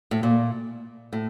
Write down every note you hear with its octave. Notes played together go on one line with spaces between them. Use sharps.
A2
A#2
A2